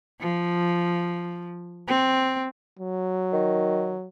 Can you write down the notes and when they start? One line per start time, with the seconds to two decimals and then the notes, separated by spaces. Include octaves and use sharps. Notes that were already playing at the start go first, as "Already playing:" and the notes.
0.20 F3
1.88 C4
2.79 F#3
3.33 D#3